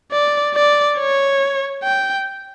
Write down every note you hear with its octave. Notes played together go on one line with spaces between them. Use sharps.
D5
D5
C#5
G5